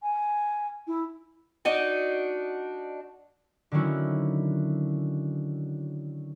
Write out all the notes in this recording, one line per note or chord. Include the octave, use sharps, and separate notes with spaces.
G#5
E4
D4 D#4 F#4
D3 D#3 F#3 C#4 E4 F#4